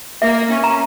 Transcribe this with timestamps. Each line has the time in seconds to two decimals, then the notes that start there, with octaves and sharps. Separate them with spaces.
0.21 A#3 E5
0.50 C#4
0.64 A#5